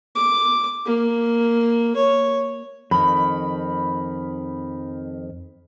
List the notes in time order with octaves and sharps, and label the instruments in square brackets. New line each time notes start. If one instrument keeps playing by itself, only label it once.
[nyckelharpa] D6
A#3
C#5
[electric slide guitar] F2 D#3 [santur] B5